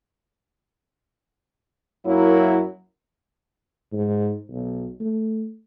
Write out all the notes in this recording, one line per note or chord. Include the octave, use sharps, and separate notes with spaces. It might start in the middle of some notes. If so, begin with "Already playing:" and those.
F#2 F#3 A#3 E4
G#2
B1
A3